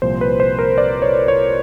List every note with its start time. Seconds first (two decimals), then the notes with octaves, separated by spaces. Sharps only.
0.02 C2 A#2 F3 C5
0.21 B4
0.40 C5
0.59 A#4
0.78 D5
1.02 C#5
1.28 C#5